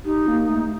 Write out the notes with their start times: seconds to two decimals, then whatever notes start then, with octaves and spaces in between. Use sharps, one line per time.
0.05 D#4 G4
0.27 A#3
0.49 A3
0.64 A3